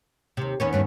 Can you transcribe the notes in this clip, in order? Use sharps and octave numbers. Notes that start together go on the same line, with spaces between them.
D#2 C3
D#2 B3 C#4
G2 D3 A3